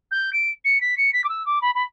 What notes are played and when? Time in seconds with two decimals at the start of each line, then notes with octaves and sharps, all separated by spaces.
0.11 G6
0.33 D7
0.64 C#7
0.81 B6
0.97 C#7
1.13 B6
1.24 D6
1.29 E6
1.46 D6
1.61 B5
1.75 B5